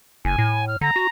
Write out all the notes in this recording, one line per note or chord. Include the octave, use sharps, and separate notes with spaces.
F#1 G#5
A2
F6
D3 A#5
F#4